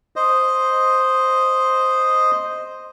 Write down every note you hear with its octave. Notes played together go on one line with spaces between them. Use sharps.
C5 D#5